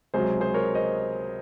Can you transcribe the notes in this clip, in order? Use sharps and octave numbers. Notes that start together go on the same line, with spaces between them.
C#2 C3 F#3 G#4 C5
G#4 C5
A#4 C#5
C5 D#5